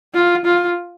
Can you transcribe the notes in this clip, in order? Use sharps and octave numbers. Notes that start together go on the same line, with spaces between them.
F4
F4